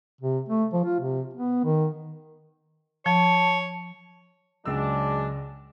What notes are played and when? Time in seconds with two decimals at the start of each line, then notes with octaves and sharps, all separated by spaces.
0.21 C3
0.49 A3
0.73 F3
0.85 F4
1.00 C3
1.34 B3
1.64 D#3
3.06 F3 C#5 A5
4.66 C#2 F#3 G#3 D4 E6